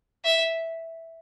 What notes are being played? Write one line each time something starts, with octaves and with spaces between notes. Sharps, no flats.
E5